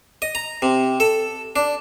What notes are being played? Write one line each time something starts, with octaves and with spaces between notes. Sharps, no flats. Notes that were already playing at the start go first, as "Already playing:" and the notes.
D#5
A#5
C3
A4
D4